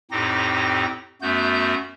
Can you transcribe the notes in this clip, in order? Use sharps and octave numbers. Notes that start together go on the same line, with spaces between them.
F2 A2 C4 D#4 G4 A#6
F#2 A3 B3 F#4 G6